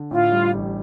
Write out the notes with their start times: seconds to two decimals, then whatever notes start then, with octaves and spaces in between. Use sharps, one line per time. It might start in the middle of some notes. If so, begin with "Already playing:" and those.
Already playing: D3
0.10 A2 F4
0.32 G3
0.54 A1